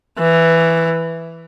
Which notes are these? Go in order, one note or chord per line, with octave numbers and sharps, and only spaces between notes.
E3